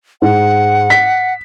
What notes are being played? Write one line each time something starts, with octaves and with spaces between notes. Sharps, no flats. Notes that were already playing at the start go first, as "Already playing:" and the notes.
G#2 F#5
B6